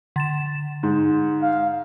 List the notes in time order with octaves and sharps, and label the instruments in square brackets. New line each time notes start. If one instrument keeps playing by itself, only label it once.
[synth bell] D3 A6 E7
[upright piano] G#2
[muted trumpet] F5